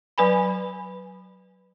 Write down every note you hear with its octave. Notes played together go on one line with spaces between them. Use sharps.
F#3 B4 G#5 B5